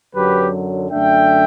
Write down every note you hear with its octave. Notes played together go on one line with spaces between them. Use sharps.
F#2 D3 F#3 G4 B4
F#2 D3 A3 D4 E5 G5